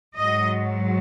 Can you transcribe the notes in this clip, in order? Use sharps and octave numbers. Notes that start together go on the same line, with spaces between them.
G#2 F#3 D#5